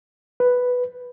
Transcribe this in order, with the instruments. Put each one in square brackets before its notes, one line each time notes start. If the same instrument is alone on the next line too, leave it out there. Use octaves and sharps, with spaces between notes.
[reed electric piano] B4